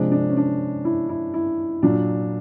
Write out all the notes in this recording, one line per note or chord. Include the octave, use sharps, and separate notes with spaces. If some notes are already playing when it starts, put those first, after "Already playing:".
Already playing: C3 F3 G#3 D4
D4
C#4
D4
E4
E4
E4
A#2 F#3 D4